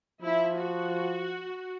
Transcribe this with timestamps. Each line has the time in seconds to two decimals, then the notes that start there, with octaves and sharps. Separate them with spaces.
0.22 F3 E4
0.56 F#4